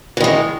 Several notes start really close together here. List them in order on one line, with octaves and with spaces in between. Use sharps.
E3 D#3 G#3